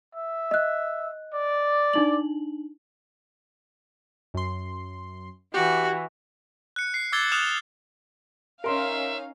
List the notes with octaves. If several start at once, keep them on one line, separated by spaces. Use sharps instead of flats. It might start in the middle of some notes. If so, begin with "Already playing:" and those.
E5
D#5 F#6
D5
D4 D#4 F#7
F#2 C6
E3 F#4 G4
F#6 C#7
C7
D6 E6 G#6 A6 C7 G7
D#6 F6 F#6 E7 F7
C#4 D#4 A#4 E5 F5 C6